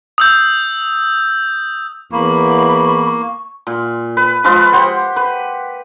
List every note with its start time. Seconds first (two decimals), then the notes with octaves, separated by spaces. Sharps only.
0.18 D#6 E6 G6
2.12 E2 A#3 B5 C#6
3.67 A#2
4.17 B4
4.44 F3 G#3 F4 B4
4.73 G4 C5 F#5
5.16 B4